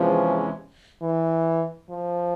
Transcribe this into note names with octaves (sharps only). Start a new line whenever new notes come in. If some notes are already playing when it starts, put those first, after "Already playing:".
Already playing: E2 C3 E3 F3 G#3 C#4
E3
F3